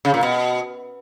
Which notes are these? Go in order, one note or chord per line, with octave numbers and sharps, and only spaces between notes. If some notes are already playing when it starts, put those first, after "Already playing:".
C#3
A#2
B2